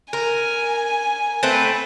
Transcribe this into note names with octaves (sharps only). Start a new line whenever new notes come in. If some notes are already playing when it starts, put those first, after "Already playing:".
A#4 G#5
A3 C4 B4